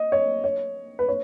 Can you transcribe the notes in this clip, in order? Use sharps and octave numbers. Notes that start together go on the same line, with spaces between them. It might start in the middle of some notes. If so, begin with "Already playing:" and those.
Already playing: D#5
C#5
C#5
B4
C#5